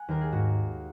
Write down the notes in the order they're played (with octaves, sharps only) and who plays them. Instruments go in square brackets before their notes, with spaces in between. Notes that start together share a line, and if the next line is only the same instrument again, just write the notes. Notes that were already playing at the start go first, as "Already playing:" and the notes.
Already playing: [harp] F#5 G#5
D#2 A#4
G#4
G#2 F#4